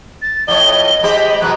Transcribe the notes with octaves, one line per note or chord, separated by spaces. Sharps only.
A6
F2 A2 C#5 D#5 G7
G#3 G4 C5 B5
F#2 B2 F#3 F#6